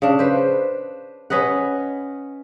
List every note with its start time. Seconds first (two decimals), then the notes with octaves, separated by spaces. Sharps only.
0.02 C#3 D4
0.19 B4 C5
1.30 C#4 B4 D#5 F#5